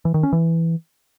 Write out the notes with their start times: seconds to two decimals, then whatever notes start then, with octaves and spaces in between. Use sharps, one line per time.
0.05 E3
0.14 D#3
0.23 C#4
0.32 E3